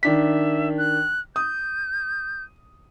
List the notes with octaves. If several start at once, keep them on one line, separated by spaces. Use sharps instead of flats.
D#3 D4 E5 B6
F#6
D#6 G6